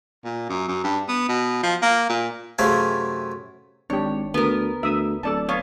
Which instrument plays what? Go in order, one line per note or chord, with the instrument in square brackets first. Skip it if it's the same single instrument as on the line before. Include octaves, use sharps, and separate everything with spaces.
[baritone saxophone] A#2
F#2
F#2
G2
B3
B2
F3
A#3
A#2
[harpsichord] F#2 C3 A3 G#4 E5 F5
[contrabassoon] G#1 [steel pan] D4 G4 [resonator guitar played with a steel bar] C#5
[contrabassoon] D2 [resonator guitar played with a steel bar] B3 A#4
[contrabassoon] D2 [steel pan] E5 D#6
[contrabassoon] D1 [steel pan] A4 D5 A5
[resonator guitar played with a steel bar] B3 [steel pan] C#5 F5